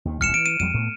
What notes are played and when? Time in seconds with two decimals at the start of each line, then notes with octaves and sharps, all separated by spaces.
0.05 D#2 D#3
0.21 D#1 C2 F6 C#7 E7
0.34 E3 D7
0.46 D#7
0.60 F2 F#3 G3 D#7
0.74 A2 A3 B3